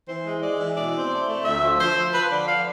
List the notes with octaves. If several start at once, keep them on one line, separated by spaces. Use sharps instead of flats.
E3 C5
G#3
G#3 D5
E3
B2 D5
C4
A3
A3
D2 E5
F3
F3 C5
F3
F3 B4
D3 D5
F5